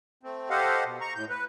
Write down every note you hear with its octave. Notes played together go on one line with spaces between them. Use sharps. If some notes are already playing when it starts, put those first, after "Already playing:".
A3 C4
G4 A4 C5 D#5 F5 F#5
B2
A#5 C#6
A2 G6
B4